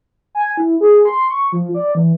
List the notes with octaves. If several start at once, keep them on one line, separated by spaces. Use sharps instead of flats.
G#5
E4
G#4
C6
C#6
F3
D5
E3